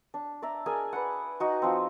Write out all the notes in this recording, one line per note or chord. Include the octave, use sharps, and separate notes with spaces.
D4
D5 E5 A#5
G#4 A#4 D5 G#5
B4 D5 F#5
D#4 F#4
F3 C4